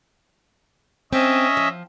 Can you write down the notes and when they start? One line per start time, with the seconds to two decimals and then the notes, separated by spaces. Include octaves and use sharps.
1.13 C4 C#4 D#5 E5
1.57 F3